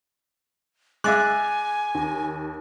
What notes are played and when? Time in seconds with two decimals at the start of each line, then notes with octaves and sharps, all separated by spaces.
1.04 G#3 D#5 E5 G#5 D6 F#6 A6
1.95 D#2